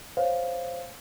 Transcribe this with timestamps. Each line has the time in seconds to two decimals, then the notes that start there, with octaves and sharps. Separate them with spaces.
0.17 C5 C#5 F5